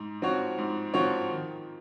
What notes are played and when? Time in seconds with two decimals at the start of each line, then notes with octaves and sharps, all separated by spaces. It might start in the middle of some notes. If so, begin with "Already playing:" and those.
Already playing: G#2
0.22 F3 C4 F#4 C#5
0.58 G#2
0.93 F3 C4 F#4 C#5
1.30 D#3